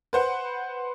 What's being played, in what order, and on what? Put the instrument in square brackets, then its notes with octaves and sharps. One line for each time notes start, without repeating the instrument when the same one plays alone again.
[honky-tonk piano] B4 C5 F#5